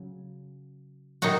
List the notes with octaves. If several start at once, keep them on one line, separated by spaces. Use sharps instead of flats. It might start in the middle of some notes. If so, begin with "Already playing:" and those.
Already playing: C#3 F#3
D#3 F#3 D#4 F#4